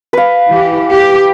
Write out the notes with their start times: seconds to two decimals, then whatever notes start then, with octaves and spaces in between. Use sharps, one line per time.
0.13 B4 F5
0.50 E3 G4
0.93 G4